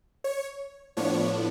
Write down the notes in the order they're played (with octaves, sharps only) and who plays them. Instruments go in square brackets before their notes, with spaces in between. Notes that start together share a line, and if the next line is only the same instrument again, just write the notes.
[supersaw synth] C#5
A2 F3 B3 D4 C#5